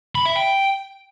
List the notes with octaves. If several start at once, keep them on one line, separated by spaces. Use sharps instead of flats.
B5
E5
G5